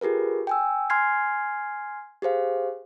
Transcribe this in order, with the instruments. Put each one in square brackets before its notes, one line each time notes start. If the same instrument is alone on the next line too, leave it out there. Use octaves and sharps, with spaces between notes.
[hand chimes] F4 G4 G#4 A#4 B4
G5 G#5 E6
G#5 C6 F6 G#6 C7
G4 G#4 C5 F5